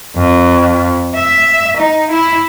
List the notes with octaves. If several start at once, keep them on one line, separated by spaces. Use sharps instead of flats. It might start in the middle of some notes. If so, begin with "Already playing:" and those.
F2
E5
D#4
E4